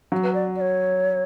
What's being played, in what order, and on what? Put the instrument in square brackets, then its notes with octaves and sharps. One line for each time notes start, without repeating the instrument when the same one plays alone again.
[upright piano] F#3
[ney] B4
D5
D5
C#5